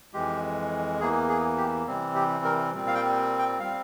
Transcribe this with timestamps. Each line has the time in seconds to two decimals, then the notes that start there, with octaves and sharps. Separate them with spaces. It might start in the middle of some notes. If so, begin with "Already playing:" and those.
0.13 F2 E3 G#3 G4
1.00 E2 E3 A#3 G#4
1.29 G#4
1.58 G4
1.87 C3 E3 G3 C4
2.15 G4
2.44 A#4
2.73 A#2 G3 C4
2.87 F5
2.95 G5
3.38 G5
3.60 G3 C4 F5